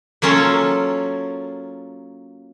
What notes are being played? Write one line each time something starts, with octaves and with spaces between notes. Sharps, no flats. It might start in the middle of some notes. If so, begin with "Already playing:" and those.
F#3 A#3 C#4 F4 A4